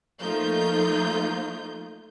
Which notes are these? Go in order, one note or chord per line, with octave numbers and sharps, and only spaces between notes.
F3 A3 A#3 D#4 F4 G6